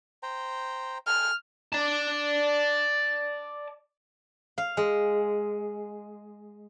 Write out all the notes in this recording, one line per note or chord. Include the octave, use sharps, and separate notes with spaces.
C5 G5 A#5
A4 G5 G#5 F6
D5 A5
F5
G#3